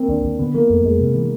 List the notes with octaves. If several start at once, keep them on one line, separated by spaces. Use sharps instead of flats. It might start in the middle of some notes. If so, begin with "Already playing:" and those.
Already playing: A#3 C4
D#2 D4
D#2
D3 B3
F3 A#3
F2 A3
F2 G#3
C3
E3